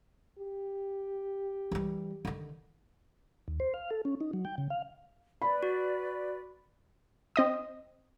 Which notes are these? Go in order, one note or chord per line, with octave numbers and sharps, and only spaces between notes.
G4
E3 G3
D3 D#3
D#2
C5
F5
A4
C#4
D#4
F#3
G5
C#3
F5
B4 D5 B5
F#4
C4 D#5 D#6